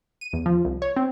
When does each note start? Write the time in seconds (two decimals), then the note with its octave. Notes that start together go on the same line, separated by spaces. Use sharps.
0.21 D#7
0.33 E2
0.46 F3
0.65 C2
0.82 C#5
0.96 C4